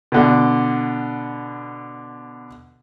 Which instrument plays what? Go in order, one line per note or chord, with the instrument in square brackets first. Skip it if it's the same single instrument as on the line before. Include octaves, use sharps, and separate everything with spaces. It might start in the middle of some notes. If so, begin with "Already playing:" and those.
[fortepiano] B2 D3